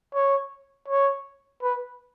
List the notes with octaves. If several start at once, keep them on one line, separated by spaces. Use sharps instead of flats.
C#5
C#5
B4